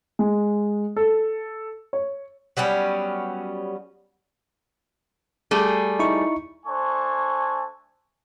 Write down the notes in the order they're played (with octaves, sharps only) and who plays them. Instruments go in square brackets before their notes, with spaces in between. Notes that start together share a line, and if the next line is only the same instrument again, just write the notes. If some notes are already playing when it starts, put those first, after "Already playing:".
[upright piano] G#3
A4
C#5
[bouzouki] F#3 G3 B3 C#4
[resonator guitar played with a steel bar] G3 A3 G#4
[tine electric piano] D#4 E4 C#6
[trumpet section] A3 D4 A4 C5 G#5 C#6